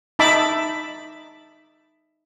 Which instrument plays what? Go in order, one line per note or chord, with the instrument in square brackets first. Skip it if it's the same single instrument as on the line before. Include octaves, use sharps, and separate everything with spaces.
[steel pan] D#4 E5 A5 B5 D6